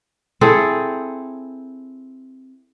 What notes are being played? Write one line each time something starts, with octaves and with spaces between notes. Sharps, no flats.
C4 E4 G#4 A4